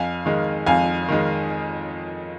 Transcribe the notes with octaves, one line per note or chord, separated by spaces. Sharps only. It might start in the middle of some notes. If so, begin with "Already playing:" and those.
Already playing: F2 F5 G#5
D#3 G#3
F2 F5 G#5
D#3 G#3